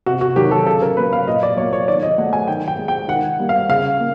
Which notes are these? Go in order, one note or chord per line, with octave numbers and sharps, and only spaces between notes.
C3 F#4
F#4
D#3 F#3 G4
A4
C#3 A4
A#4
F#3 A#3 B4
F5
A#2 D#5
D5
F#3 A#3 C#5
C#5
D#3 D5
D#5
F#3 A3 F#5
G#5
D#3 G5
G5
G#3
G5
D#3 F#5
G3 A#3
F5
C#3 F5
A#3